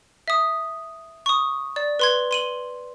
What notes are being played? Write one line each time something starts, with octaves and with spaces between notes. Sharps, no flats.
E5 D#6
C#6 D#6
D5
B4 C6 G#6
C6 D#7 F#7